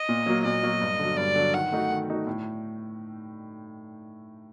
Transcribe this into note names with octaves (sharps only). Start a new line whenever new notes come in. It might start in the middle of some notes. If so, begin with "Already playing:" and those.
Already playing: D#5
A#2
F#3 A#3
A#2 D#5
F#3 A#3
G2
D3 F#3
G2 D5
D3 F#3
D#3 F#5
A3 D#4 F#4
D#3
A3 D#4 F#4
A2